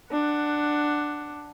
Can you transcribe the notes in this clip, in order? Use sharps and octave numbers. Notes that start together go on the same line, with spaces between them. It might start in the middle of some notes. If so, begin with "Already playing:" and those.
D4 F#5